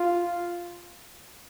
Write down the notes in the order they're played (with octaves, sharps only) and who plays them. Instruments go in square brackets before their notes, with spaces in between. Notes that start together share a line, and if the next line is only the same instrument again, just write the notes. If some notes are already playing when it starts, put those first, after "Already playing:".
Already playing: [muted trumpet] F4